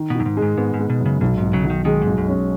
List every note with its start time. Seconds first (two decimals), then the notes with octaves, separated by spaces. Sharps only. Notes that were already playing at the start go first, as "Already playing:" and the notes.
Already playing: D#3
0.10 B2
0.15 F#2 D#3
0.26 G#2
0.37 G#3
0.42 G#2
0.57 G#2 B3
0.74 G#2
0.79 G#3
0.90 B2
1.00 F#2
1.06 C#3
1.21 B1 B2
1.38 G#2
1.43 B1
1.53 C#3 F#3
1.64 B1
1.70 D#3
1.85 D#3 G#3
2.02 G#2
2.07 B1
2.18 F#2
2.28 C#4